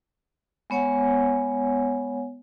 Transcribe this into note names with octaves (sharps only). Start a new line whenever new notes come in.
G#3 B3 C#5 F#5 G#5